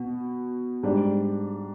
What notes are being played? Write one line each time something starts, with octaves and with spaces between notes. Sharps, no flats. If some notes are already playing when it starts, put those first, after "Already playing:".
Already playing: B2 B3
G#2 G3 D4